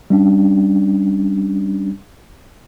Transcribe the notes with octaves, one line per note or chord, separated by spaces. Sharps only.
G3 C#4 D4